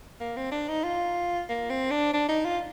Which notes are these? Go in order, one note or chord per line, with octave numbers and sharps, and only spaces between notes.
A#3
C4
D4
D#4
F4
A#3
C4
D4
D4
D#4
F4